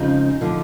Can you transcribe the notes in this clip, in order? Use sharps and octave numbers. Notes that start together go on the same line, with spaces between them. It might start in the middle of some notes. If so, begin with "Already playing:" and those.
Already playing: F2 C#3 F3 G#3 D#4
D3 F3